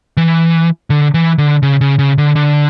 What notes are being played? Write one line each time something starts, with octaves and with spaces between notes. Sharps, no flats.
E3
D3
E3
D3
C#3
C#3
C#3
D3
D3